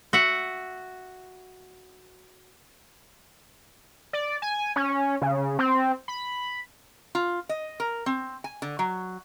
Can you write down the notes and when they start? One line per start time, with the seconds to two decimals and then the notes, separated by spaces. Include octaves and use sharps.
0.13 F#4 E5 F#5
4.13 D5
4.42 G#5
4.76 C#4
5.22 C#3
5.59 C4
6.08 B5
7.15 F4
7.49 D#5
7.80 A#4
8.06 C4
8.44 G#5
8.62 D3
8.79 F#3